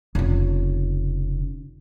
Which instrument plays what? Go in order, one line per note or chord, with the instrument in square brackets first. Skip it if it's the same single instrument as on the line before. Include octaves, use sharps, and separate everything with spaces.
[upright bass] F1 C#3